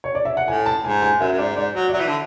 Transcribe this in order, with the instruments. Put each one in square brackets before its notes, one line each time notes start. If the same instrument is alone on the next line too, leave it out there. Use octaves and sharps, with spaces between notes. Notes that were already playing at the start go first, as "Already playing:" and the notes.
[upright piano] C#5
D5
E5
F#5
[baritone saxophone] A2 [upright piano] G#5
[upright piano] A5
[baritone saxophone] G#2 [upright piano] G#5
[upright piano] G#5
[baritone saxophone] F#2 [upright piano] E5
[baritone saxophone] F#2
[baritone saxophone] G#2 [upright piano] D5
[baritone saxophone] G#2 [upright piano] D5
[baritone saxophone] F#3 [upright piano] C#5
[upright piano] D5
[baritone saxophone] F#3 [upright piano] E5
[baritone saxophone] E3
D3